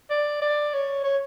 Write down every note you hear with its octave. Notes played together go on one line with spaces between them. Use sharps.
D5
D5
C#5
C#5